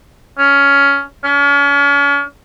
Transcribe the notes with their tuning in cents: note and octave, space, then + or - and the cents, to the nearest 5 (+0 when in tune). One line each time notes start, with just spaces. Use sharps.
C#4 +15
C#4 +40